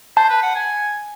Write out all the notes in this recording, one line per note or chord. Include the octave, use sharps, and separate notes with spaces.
C5 A5
B4
F#5
G#5